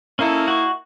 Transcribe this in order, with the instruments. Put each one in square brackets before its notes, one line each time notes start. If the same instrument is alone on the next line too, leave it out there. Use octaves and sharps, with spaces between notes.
[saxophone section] A#3 D#4 E4 [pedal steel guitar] C#4 A4
[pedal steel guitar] F#4 C#6